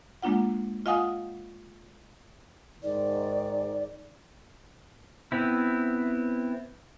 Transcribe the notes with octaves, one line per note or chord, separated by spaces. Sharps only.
G#3 A#3 D4 F4 F#5
F4 D#5 F5 F#5 G#5 D#6
G#2 D#3 D5
B3 C4 E4